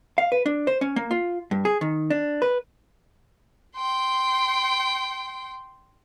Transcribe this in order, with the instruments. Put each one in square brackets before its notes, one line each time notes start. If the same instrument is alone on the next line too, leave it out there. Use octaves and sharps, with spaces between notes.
[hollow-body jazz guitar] F5
B4
D4
C5
C#4
A#3
F4
G2
G#4
D#3
D4
B4
[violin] G5 C6